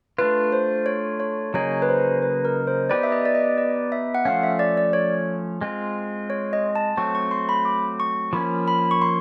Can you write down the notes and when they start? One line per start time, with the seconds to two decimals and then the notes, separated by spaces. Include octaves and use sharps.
0.18 A3 D4 F4 B4
0.52 C5
0.86 C#5
1.20 C#5
1.54 C#3 F#3 A#3 D#4 G#4 C#5
1.82 B4
1.89 C5
2.22 B4
2.45 A#4
2.67 C5
2.90 B3 D#4 G4 B4 D5
3.03 E5
3.12 D#5
3.25 D5
3.35 D#5
3.58 D5
3.92 E5
4.15 F#5
4.25 F3 A3 C#4 F5
4.43 E5
4.59 D5
4.77 D5
4.93 C#5
5.61 G#3 C4 F4
6.30 C#5
6.53 D#5
6.75 A5
6.97 F#3 A3 C4 C#6
7.15 C#6
7.31 C6
7.49 B5
7.65 D6
8.00 C#6
8.33 F3 A#3 C#4 B5
8.68 B5
8.91 C#6
9.02 C6